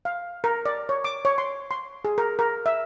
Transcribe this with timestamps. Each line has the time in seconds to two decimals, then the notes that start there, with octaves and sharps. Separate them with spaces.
0.05 F5
0.44 A#4
0.66 D5
0.89 C#5
1.04 D6
1.25 C#5
1.38 C6
1.71 C6
2.05 G#4
2.18 A#4
2.39 A#4
2.66 E5